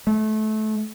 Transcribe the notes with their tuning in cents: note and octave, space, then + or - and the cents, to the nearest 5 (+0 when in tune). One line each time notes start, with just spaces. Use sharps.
A3 -25